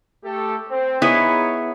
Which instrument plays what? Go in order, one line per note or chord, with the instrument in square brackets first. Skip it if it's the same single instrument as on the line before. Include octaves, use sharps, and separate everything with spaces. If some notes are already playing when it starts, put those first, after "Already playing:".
[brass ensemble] A3 G4 A4
C4
[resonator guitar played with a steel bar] B3 E4 G#4 [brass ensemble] D#4 C#5